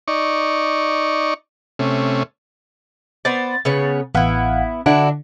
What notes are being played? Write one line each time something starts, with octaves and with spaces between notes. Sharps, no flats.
D#4 D5 C#6
C3 A3 C#4
B3 C5 D5 A6
C#3 B3 C#5
A1 B3 E4 F5 F#5
D3 D4 E4 F#4